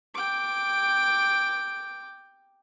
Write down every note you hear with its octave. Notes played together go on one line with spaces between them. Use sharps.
G5 D6